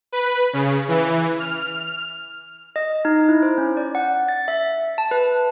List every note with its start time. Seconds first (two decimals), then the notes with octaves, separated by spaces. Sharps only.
0.12 B4
0.53 C#3
0.88 E3
1.40 F6
2.76 D#5
3.05 D#4
3.29 E4
3.43 C5
3.58 C#4
3.77 D5
3.95 F#5
4.28 A6
4.48 E5
4.98 A5
5.11 B4